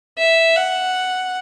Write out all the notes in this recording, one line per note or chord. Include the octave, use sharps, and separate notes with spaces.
E5
F#5